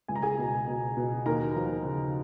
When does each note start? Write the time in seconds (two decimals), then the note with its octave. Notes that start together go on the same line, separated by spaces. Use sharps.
0.08 C#2 G#5
0.16 A#5
0.23 G#4 G#5
0.38 B2
0.67 B2
0.97 B2
1.26 D#2 A#4 A#5
1.56 F3
1.85 C#3